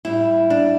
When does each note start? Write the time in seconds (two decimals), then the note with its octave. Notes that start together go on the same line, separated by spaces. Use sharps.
0.05 A2 G3 E4
0.50 D4